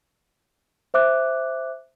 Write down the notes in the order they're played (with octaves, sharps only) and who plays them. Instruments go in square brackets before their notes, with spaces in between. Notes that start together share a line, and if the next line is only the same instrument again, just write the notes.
[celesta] C5 E5 D6 F#6